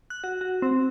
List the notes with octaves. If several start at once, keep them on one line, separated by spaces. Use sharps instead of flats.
F#6
F#4
F#4
C4